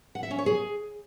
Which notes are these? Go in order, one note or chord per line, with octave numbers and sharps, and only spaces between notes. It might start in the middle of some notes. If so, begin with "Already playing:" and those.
F#5
E5
C#4
C#5
G#4